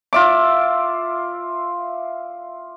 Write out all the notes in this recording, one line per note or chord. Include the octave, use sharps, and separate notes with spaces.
F4 E5 D6